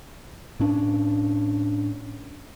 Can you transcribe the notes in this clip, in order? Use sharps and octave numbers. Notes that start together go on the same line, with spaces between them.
A2 C#4 D4